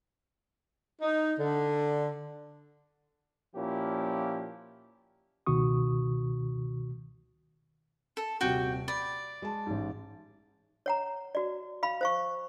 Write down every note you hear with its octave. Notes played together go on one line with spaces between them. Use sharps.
D#4
D3
A#2 F3 A#3 C#4 E4 G4
C#2 B2 D#3 F#4 C#6 D#6
A4
D#1 C3 F#4 G5 D7
D5 B5
G#3 A5
A1 G#2
C#5 F#5 A#5
F#4 D5
F5 B5
C5 F5 C#6